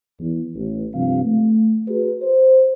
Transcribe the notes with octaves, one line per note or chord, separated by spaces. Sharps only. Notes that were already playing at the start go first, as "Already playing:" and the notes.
E2
A1
G2 C3 F3 C4 F5
A3
F#4 G#4 B4
C5